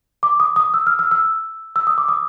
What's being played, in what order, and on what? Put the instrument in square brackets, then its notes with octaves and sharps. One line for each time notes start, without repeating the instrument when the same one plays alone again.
[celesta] D6
D#6
D#6
E6
F6
E6
E6
E6
D#6
D6
D#6